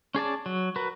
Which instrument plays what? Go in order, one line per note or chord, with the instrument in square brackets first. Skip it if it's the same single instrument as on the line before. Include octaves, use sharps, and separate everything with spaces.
[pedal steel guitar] C#4 G#4 D5 A5
F#3
F#4 A#4 B4